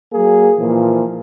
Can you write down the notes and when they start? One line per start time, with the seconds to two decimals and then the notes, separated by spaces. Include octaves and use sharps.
0.13 F#3 A#3 G#4
0.58 A#2 E3 F3